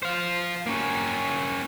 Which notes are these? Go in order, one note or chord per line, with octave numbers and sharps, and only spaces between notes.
C5 F5
A#3 C#4